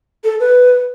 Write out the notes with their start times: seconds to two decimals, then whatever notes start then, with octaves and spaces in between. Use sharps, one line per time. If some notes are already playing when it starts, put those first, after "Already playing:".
0.24 A4
0.40 B4